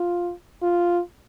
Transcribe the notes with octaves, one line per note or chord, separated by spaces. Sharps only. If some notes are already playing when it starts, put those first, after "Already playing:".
Already playing: F4
F4